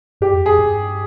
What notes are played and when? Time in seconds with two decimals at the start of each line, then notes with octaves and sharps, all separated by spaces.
0.21 G2 G4
0.33 F2
0.46 F2 G#4
0.59 G2